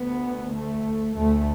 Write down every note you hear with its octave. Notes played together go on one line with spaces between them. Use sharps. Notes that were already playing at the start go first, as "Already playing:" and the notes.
Already playing: D2 B3
A3
D2 A3